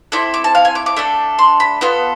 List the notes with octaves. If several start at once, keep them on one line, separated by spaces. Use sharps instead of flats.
C4 E4 A4 D6
D6
A5
F5
G#5
D6
D6
A3 D4 A4
C6
B5
B3 F4 A4